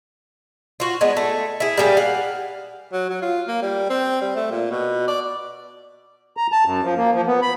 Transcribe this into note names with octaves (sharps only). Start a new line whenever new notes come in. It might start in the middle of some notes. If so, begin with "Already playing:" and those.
F4 F#4
G#3 B3 D4
A3
E4 G#4
G3 A#3 G4 G#4
F5 F#5
F#3
F#3
F4
A#3
G3
C4
G3
A3
A#2
B2
D5
A#5
A5
F#2
F3
A#3
F3
B3
B5